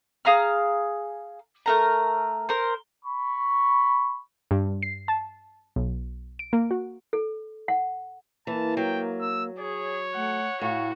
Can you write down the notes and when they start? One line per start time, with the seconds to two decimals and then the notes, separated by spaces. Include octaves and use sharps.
0.25 G#4 F5 A#5 F6
1.66 A3 A#4 A#5
2.49 A#4 C5
3.05 B5 C#6
4.51 G2
4.83 C7
5.08 A5
5.76 B1
6.39 D7
6.53 A#3
6.71 F#4
7.13 A4
7.68 F#5
8.47 E3 A#3 A5
8.77 F#3 G5
9.21 E6
9.59 G#4 C#5
10.14 A3 F#5
10.61 A2 F#4 F5